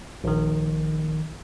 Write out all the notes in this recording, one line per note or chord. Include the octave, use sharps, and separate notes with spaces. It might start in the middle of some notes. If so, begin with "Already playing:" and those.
A#1 D#3